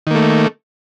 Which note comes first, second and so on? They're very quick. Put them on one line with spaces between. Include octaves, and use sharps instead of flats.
D#3 A#3 A3